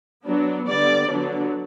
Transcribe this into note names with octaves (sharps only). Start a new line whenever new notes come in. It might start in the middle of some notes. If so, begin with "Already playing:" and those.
F#3 B3 D4
D3 G3 B3 D5
D3 F#3 B3 D4